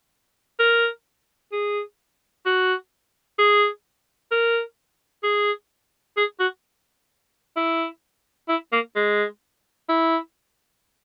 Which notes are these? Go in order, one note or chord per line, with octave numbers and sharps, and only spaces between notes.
A#4
G#4
F#4
G#4
A#4
G#4
G#4
F#4
E4
E4
A#3
G#3
E4